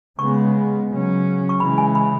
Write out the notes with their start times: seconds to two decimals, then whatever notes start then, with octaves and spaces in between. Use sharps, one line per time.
0.18 C#3 G#3 B3 C#6
0.89 C#3 F#3 C#4
1.49 C#6
1.59 C#3 E3 G#3 B5
1.78 G#5
1.95 B5